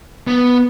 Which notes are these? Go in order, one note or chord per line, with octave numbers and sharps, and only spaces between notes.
B3